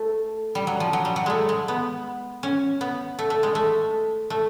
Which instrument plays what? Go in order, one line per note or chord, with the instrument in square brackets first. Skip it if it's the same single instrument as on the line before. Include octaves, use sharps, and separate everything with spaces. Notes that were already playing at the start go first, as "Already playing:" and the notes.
Already playing: [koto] A3
G3
F#3
F3
F#3
G3
F#3
G#3 A3
G#3
B3
C#4
B3
A3
A3
G#3
A3
A3